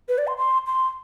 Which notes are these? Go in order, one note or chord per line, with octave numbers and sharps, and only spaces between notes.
B4
D5
C6
C6
C6